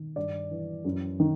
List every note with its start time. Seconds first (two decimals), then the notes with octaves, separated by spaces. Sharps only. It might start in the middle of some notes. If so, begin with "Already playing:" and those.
Already playing: D#3
0.16 G2 D5
0.51 E3
0.85 F#2
1.20 D#3